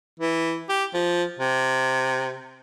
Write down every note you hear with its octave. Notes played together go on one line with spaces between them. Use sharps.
E3
G4
F3
C3